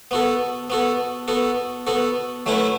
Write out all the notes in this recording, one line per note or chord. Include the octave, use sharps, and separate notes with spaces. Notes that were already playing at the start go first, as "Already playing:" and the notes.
B3 F#4 A4
B3 F#4 A4
B3 F#4 A4
B3 F#4 A4
F#3 A3 C#4 E4 B4